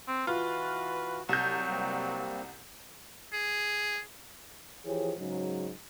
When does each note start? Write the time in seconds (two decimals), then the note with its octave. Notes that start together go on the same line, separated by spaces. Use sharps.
0.07 C4
0.27 E3 F4 F#4 B4
1.29 C2 F#3 A5 G6
1.69 G3 A#3 C4
3.33 G#4
4.85 E3 F3 G4 G#4 C#5
5.18 G#2 C#3 F#3